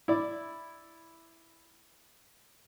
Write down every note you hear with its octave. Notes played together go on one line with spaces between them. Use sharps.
E4 D5